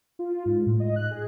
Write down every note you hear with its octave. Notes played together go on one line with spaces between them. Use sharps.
F4
G#2
A2
D#5
F#6
G#4